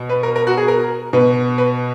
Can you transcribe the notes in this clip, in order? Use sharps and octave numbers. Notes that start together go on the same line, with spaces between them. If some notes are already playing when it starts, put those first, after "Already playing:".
Already playing: B2
B4
A#4
A#4
F#4
G#4
A#4
B2 B4
B4